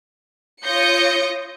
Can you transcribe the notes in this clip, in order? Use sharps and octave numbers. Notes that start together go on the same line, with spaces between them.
F4 C#5 D#6 G6 A#6 C#7